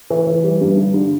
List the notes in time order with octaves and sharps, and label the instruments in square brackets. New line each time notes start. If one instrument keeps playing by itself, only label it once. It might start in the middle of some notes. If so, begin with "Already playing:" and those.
[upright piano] E3
E3
G3
G2
D3
D3